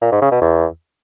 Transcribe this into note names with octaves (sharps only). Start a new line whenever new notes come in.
A#2
G#2
C#3
B2
E2